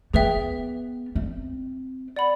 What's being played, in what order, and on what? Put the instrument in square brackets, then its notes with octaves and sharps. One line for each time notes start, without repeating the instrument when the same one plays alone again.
[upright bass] B3 [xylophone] G#4 B4 E5 G5
[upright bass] C4
[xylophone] D5 F#5 B5